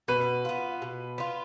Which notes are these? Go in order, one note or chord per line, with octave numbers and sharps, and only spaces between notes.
B2 B4
B3 F4
B2
B3 F4